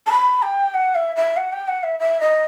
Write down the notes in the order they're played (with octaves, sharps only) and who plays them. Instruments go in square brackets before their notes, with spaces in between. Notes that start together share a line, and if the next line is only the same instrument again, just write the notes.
[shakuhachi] A5
B5
G5
F#5
E5
E5
F#5
G5
F#5
E5
E5
D#5